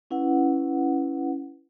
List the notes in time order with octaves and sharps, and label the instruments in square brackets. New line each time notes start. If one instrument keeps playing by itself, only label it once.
[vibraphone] C#4 E4 B4 F#5